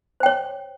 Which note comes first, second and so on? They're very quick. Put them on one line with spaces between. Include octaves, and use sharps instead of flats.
C5 G5 C#5